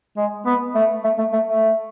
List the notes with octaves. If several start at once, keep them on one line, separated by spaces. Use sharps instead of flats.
G#3
B3
A3
A3
A3
A3
A3